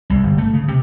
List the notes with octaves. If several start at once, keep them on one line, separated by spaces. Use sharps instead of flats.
C2
G1
A3
C#3
C3